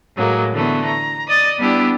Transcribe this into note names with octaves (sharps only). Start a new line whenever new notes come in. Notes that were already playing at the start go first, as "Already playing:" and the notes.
A2 F#3 G#3 A#3
D3 E3 A3 B3
A#5
D5 D#5 D#6 A6
G3 B3 D4 E4 G4